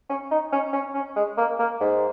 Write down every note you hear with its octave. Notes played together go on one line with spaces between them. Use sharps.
C#4
D#4
C#4
C#4
C#4
G#3
A#3
A#3
G#2